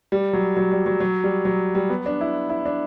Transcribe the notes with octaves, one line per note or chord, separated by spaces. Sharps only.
G3
F#3
F#3
G3
F#3
F#3
G3
F#3
G3
B3
D4
E4
E4
D4